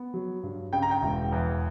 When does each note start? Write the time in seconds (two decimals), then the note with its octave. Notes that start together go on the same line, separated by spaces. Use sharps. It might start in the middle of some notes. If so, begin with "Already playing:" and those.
Already playing: B3
0.14 F#3
0.43 G2
0.73 C#3 G5
0.82 A#5
0.91 G5
1.02 E1
1.32 E2